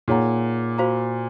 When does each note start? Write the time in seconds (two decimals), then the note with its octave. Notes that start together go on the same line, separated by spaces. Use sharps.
0.08 A#2 D#4 G#4 C#5 F#5 A#5
0.78 F#4 C5 F5 A#5